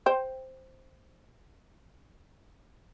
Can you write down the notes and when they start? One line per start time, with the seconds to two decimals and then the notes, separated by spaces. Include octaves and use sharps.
0.06 C5 G5